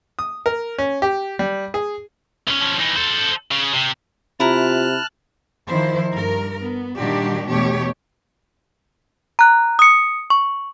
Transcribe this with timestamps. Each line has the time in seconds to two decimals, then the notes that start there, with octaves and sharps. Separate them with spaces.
0.19 D#6
0.46 A#4
0.78 C#4
1.02 G4
1.39 G3
1.74 G#4
2.47 B1 C#4
2.61 F3 C#4
2.80 E3 D#4
2.96 A4 C5
3.51 C#3
3.74 C3
4.40 C3 E4 F4 A5 A#5 F6 F#6
5.68 D#3 F3 E4 C5
6.13 G2 A#4
6.60 B3
6.96 A#2 D#3 G3 D4 F#4 G4
7.49 E2 B2 A3 G4 C#5
9.39 A#5 F#6
9.79 D#6 C#7
10.30 C#6